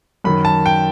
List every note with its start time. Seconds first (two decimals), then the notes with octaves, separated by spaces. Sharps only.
0.24 F#2 D#3 B5
0.45 A5
0.66 G5